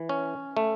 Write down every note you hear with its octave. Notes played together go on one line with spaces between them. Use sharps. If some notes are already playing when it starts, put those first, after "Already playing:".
Already playing: E3
C#4
A3